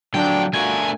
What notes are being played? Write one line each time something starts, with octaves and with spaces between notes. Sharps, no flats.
D3 F3 F#3 D4 G5
A3 D4 F4 F#4 A#4 G#5